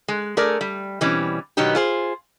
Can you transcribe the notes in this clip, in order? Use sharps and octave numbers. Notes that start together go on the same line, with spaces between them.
G#3
A3 G#4 A#4 D5
G3
B2 E3 G3 C4 C#4
B2 D#3 F#3 B3 D#4 G4
F4 G#4 C5